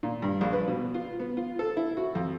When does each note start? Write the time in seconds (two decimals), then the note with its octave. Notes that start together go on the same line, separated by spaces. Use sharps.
0.03 A#2
0.22 G2
0.41 A#1
0.53 B4
0.68 B2
0.94 F4
1.20 B3
1.37 F4
1.59 A4
1.77 E4
1.97 F#4
2.15 F2